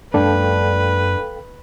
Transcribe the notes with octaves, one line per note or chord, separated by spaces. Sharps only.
F#2 G#3 A#3 D4 A4 B4 F5 G5